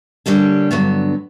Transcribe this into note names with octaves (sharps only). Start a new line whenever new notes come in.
D3 G3 A#3 C#4 G4
G2 D3 F#3 B3